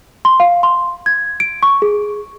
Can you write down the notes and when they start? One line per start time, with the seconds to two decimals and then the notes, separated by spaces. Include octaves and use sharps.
0.25 C6
0.40 F5
0.63 C6
1.06 G#6
1.40 D7
1.63 C#6
1.82 G#4